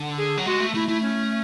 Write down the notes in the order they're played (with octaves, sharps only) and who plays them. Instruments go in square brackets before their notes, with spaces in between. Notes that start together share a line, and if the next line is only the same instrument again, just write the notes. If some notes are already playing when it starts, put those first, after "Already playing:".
Already playing: [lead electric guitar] D3
[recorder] G#4
[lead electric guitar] F#3
[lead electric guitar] G#3 [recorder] F#4
[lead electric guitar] A3
[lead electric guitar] A3 [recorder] E4
[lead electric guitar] A3 [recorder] E4
[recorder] C#4